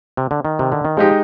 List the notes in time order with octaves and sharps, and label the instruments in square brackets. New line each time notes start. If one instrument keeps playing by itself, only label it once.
[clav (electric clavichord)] C3
D3
D#3
C3
D3
D#3
[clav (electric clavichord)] F3 [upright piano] G#3 D#4 G4